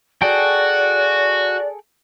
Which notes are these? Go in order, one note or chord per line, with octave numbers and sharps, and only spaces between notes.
F#4 G#4 A4 D5 G5